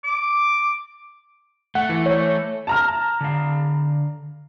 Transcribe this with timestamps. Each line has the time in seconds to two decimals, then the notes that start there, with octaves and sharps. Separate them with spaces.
0.04 D6
1.75 A3 F#5
1.89 E3
2.06 C#5
2.67 A5 A#5 F6
3.21 D3 F5